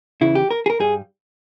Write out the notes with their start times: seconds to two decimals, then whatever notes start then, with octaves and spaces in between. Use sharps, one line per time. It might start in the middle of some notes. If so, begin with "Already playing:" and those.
0.21 E2 C#3 E3 E4
0.35 G4
0.50 A#4
0.66 G#4
0.70 A#4
0.80 G2 G3 G#4